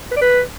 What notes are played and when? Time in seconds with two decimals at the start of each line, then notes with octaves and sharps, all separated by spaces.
0.11 B4
0.17 D5
0.22 B4